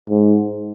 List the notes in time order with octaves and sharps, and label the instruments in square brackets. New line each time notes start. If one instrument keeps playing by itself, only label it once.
[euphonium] G#2